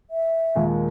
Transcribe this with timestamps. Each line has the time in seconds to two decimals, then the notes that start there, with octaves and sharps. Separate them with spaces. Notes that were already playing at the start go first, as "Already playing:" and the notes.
0.11 E5
0.55 D#2 A#2 G#3